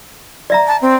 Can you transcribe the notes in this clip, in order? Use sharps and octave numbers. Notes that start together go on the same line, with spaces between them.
D5 E5 A#5
A5
C4